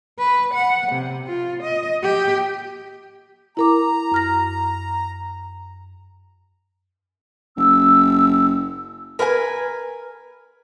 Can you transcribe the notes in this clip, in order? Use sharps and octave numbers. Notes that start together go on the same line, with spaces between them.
B4
F#5
C3
F4
D#5
G4
E4 A#4 A#5 D6
F#2 F6 A#6
F#1 E6
A#4 B4 F#5 G#5